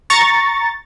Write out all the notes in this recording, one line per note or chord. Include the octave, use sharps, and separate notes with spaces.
A#5 C#6 A6